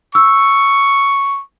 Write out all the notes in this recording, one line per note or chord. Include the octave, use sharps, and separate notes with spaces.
C#6 E6